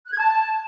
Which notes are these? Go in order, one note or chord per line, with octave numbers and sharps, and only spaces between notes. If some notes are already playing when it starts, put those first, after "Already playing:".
F#6
G#6
A5